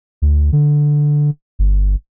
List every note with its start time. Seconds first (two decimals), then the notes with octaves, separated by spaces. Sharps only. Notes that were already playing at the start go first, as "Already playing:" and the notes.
0.22 D2
0.52 D3
1.59 G1